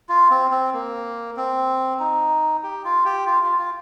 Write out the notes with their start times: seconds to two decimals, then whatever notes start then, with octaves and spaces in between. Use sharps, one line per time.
0.09 F4
0.31 C4
0.51 C4
0.73 A#3
1.37 C4
2.00 D#4
2.63 G4
2.85 F4
3.05 G4
3.27 F4
3.43 F4
3.59 F4